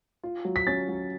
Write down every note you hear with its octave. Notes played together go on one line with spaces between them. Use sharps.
F4
F#3
B6
C#4 A6
F#3